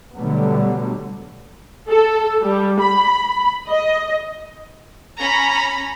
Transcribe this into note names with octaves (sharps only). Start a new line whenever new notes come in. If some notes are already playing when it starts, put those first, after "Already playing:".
B2 D3 F#3 G3 A3 B3
A4
G3
B5
D#5
C#4 A#5 B5